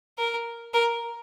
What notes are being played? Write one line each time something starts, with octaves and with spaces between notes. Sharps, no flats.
A#4
A#4